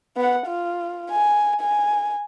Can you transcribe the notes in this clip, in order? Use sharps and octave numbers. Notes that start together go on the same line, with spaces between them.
B3 F#5
F4
G#5
G#5